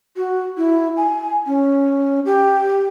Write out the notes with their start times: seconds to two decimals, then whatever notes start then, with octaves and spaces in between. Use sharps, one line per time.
0.16 F#4
0.58 E4
0.97 G#5
1.47 C#4
2.25 G4